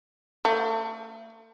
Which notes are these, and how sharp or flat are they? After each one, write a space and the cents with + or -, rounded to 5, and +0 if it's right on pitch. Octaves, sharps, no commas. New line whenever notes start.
A3 +40